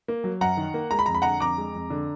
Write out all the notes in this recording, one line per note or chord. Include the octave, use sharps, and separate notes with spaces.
A#3
F#3
F#2 F#5 A#5
D#3
A#3
G#3 A#5
B5
F2 A#5
B5
D3 F#5 A#5
F2 A#5 D6
G#3
F2
D3